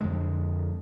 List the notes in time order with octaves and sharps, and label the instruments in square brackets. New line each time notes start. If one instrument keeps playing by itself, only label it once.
[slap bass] F2 D3 G#3